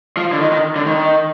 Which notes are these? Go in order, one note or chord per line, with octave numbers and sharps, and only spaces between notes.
F3
D3
D#3
D#3
D3
D#3